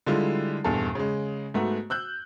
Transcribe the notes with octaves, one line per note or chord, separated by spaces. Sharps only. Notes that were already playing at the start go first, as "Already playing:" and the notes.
D3 G3 G#3 E4 F4
D#1 E2 G2 A4
C#3 G#3
G#2 A3 B3 F#4
E6 F#6 G6